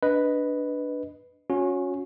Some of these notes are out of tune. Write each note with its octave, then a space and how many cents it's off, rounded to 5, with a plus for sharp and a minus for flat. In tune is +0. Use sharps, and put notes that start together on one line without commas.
D4 +0 B4 +0 D#5 +0
C#4 +0 F#4 -35